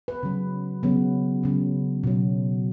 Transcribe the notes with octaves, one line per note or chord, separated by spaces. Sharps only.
B4
C#3 F#3
C#3 F#3 B3
C#3 F#3
B2 F#3